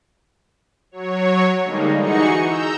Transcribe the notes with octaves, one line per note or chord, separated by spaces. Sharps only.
F#3 C#5
D3 G3 G#3 A#3 D#4
E3 D#4 F#4 G#4 C#6 C#7
A#5 E6 G6